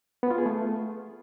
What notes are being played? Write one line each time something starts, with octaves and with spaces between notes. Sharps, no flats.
B3
F4
G#4
A3